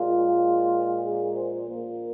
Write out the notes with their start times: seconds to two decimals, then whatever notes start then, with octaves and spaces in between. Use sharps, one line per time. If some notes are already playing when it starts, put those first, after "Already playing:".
Already playing: A#1 A#2 G#3 F4
1.01 G#4
1.34 C5
1.66 A#1 A#2 A#3